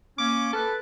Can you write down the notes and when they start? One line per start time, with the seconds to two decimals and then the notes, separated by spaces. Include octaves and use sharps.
0.18 A#3 C#4 D6
0.53 A4 B4